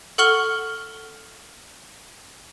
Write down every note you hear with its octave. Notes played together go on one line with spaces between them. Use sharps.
A4 F#5 C#6 F6 F#7 G7